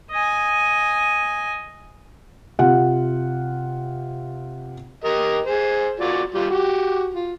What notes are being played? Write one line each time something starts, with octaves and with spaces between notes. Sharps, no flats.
D#5 G#5
C3 F4 F#5
G4 A#4 D#5
G#4 C5
F4 F#4 D5
G3 F4
F#4 G4
F4